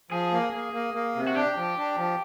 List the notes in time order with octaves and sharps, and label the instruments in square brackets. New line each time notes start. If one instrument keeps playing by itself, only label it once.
[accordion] F3 [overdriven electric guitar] G#4
[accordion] A#3
A#3
A#3
A#3
C3
[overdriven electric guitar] F#4
[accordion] D4 [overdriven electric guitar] G4
[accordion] F3
D4
F3